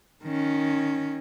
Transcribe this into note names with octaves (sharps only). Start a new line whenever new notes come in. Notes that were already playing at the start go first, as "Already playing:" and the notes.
D#3 C#4